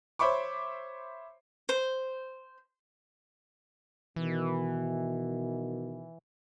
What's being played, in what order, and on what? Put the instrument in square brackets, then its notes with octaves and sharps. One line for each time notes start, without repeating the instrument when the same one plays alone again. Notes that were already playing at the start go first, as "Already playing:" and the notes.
[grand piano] C5 C#5 E5 B5 C#6 D6
[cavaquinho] C5
[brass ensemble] B2 D#3 [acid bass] E3